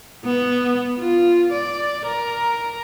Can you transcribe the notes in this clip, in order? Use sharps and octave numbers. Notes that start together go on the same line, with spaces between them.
B3
F4
D5
A#4